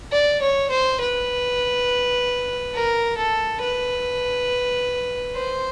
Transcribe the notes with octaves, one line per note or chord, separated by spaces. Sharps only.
D5
C#5
C5
B4
A#4
A4
B4
C5